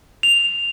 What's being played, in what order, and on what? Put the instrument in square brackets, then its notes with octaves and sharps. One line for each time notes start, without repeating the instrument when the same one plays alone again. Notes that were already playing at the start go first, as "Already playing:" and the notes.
[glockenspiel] F7